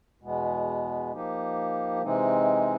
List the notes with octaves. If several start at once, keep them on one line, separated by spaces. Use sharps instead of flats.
E2 B2 G#3 B3
F3 A#3 D#4 G4
C3 E3 G#3 C4 D#4